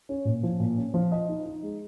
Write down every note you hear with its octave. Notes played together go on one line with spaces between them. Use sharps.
C#4
A#2
F3
A#2
C#4
F3
D#5
D#4
D#4
G#3